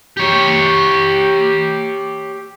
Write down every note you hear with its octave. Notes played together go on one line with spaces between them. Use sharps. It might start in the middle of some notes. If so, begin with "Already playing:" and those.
G4 C#5